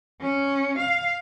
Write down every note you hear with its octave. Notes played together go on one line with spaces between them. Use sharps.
C#4
F5